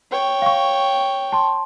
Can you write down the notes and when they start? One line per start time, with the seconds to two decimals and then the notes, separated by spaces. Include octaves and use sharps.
0.11 C#5 G5
0.42 F5 C#6
1.32 A5 C6